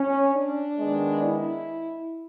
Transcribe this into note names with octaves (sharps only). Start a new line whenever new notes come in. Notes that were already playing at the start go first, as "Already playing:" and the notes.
Already playing: C#4
D4
D#3 G#3 B3
E4